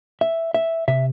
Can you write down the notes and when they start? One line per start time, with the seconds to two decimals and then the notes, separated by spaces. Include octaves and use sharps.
0.21 E5
0.54 E5
0.88 C3 E5